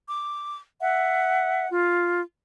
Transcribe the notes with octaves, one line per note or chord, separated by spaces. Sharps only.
D6
E5 F#5
F4